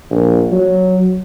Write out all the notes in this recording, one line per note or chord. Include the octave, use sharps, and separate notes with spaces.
A#1
F#3